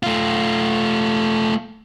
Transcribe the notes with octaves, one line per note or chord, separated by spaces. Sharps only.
A3 F4